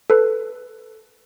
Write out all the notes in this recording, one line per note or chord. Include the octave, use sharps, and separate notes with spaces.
A4 B4